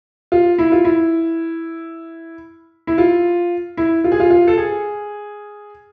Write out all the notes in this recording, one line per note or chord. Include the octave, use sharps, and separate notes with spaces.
F4
E4
F4
E4
E4
F4
E4
F4
G#4
F4
F4
A4
G#4